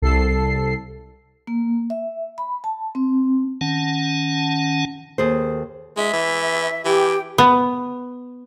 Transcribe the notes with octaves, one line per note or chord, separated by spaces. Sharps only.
C2 A4 C7
A#3
E5
B5
A5
C4
D#3 C#4 F#5 A5
D#2 G#4 A4 C5
G#3 E5
E3
E3 G4 G5
B3